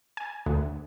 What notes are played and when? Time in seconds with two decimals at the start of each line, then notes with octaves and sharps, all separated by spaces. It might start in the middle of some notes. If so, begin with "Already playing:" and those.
0.17 G#5
0.46 D2